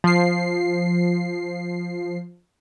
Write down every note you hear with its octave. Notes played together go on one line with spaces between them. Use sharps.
F3 C7